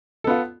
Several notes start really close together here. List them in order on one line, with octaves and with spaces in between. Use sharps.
A4 B3 F4